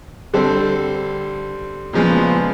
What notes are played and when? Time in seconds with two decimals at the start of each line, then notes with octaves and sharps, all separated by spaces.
0.34 D3 G3 C4 A4 C5
1.93 A#2 C#3 F3 G#3 B3